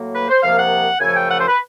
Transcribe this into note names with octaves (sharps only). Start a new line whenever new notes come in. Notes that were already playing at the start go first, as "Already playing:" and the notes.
Already playing: A2 F#3 A#3
B4
C5
C2 C3 F3 A#3 F5
F#5
F#2 C#3 F3 A3 G#5
G5
F#5
C5
B4